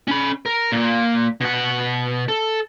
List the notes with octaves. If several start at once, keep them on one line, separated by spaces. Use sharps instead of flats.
C#4 B5
A#4
A#2 A#3
B2 F#5
A4